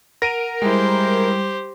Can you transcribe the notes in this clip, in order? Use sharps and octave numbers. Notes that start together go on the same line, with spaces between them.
A#4 F#5 A#6 D7 D#7
G3 G#3 E4 G4 C5